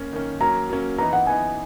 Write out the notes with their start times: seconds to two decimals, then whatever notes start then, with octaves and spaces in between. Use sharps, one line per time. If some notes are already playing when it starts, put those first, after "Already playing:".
Already playing: A#3 C#4
0.13 D#3 A#3 C#4
0.41 F#3 A#3 C#4 A#5
0.69 F#3 A#3 C#4
0.98 E3 B3 D#4 A#5
1.13 F#5
1.27 E3 B3 D#4 G#5